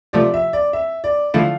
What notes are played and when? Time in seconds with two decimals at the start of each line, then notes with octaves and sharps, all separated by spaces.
0.13 C3 F3 A3 D5
0.34 E5
0.53 D5
0.73 E5
1.04 D5
1.34 D3 F3 A3 E4 F5